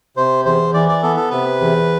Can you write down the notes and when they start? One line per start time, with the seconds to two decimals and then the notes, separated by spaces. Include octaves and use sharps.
0.16 C3 C5
0.45 E2 C5
0.74 E3 D5
0.89 D5
1.03 B3 A4
1.17 A4
1.31 C3 B4
1.60 E2